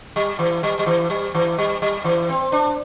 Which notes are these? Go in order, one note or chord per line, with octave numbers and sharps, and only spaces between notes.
G3
E3
G3
G3
E3
G3
E3
G3
G3
E3
C4
D4